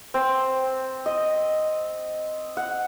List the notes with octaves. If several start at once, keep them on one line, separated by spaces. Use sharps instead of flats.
C4
D#5
F#5